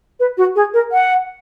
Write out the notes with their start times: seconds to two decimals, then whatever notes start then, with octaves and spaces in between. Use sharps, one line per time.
0.20 B4
0.37 F#4
0.56 G#4
0.74 A#4
0.92 F#5